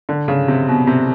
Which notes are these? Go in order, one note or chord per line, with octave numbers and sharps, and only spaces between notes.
D3
C#3
C3
B2
C3